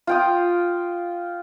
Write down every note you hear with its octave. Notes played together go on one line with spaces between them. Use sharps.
F4 G5 D#6